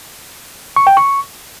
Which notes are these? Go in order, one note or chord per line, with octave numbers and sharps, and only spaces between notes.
C#6
G5
C#6